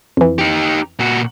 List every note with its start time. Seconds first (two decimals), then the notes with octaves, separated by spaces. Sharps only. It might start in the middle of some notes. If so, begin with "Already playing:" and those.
0.17 F2 E3
0.38 D#4 G4
0.99 A#2 F#4